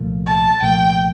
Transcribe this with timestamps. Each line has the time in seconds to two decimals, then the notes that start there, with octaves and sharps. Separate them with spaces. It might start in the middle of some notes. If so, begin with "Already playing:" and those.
Already playing: C2 A#2 F3 A3
0.26 A5
0.61 C2 A#2 F3 A3 G5